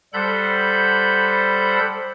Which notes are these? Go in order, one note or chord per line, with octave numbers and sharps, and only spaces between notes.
G3 A4 C5 F#5 B5 G6